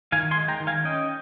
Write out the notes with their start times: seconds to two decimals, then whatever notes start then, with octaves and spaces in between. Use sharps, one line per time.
0.12 D#3 F5 G#5
0.31 G#5 C6
0.36 G#3
0.48 G5 A#5
0.60 D#3
0.67 F5 G#5
0.84 C#4 D#5 G5